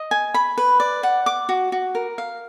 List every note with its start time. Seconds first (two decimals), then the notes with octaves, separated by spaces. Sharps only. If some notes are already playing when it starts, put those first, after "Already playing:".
Already playing: D#5
0.11 G#5
0.34 B5
0.58 B4
0.80 D5
1.03 F#5
1.26 D6
1.49 F#4
1.72 F#4
1.95 A#4
2.18 F5